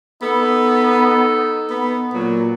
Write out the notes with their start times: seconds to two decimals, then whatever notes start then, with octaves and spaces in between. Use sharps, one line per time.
0.22 B3 D#4 A4
1.70 B3
2.14 A#2 F#3